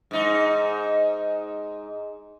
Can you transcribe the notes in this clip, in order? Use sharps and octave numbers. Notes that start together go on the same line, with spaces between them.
G#2 D#4